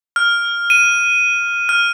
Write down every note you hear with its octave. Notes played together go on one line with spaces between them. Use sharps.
F6
D#7
F6